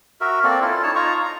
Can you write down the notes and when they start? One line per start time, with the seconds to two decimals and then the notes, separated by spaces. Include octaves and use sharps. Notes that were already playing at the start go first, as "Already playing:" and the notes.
0.21 F#4 A#4 E5
0.44 A#3 C4 A4 D5
0.61 C#4 E4 F4 A4
0.83 D#4 C#5 A5
0.95 D#4 F4 A#5 C#6
1.22 A#5